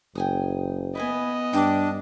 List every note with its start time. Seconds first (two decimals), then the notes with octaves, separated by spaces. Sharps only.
0.15 F#1 G5 G#5 D#6
0.95 B3 E4 B4 D#5 G#5
1.53 G2 D4 G5 D6